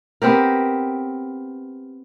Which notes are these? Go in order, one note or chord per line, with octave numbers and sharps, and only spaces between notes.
B3 C4 G4 A#4